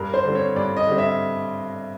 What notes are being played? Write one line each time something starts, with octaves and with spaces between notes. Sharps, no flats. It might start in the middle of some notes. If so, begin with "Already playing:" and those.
Already playing: G2 A#4
C5
D3 G3 C4
C#5
G2 D5
D#5
D3 G3 C4
E5